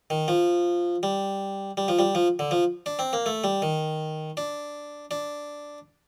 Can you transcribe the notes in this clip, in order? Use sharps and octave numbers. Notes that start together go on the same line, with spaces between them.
D#3
F3
G3
G3
F3
G3
F3
D3
F3
D4
C4
A#3
A3
G3
D#3
D4
D4